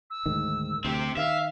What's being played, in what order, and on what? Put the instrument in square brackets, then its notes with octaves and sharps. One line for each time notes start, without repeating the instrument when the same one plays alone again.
[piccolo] E6
[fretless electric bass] D2 G#2 D#3
[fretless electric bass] D2 [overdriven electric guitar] C4 G4
[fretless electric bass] D#3 [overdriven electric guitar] E5 [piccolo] F5